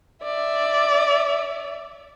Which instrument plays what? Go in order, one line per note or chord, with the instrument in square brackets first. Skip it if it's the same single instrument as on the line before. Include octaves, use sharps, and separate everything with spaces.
[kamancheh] D5 E5